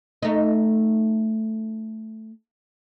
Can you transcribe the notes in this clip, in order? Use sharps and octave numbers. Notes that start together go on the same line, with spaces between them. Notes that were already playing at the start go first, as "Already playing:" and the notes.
A3 D#4